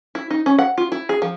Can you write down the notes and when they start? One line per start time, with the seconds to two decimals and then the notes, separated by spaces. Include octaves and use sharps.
0.15 E4
0.30 D#4
0.46 C#4
0.58 F#5
0.78 F4
0.92 E4
1.09 G#4
1.22 F3